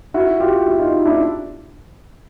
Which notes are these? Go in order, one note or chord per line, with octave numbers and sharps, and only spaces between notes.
E4 F#4
F4 G4
E4 F#4
D#4 F4
D4 E4